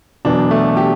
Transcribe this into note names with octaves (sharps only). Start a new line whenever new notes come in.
E1 E2 B2 F#3 D4
A3
G4